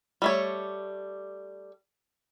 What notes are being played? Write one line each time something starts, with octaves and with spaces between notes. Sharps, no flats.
G3 A3 C#5